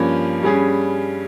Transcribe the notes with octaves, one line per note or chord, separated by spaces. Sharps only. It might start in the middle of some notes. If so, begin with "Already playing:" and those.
Already playing: G2 F3 A#3 C#4
G2 G3 C#4 G#4